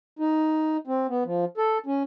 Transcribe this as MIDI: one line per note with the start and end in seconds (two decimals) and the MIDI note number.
0.19 0.77 63
0.87 1.07 60
1.09 1.24 59
1.25 1.45 53
1.57 1.78 69
1.86 2.03 61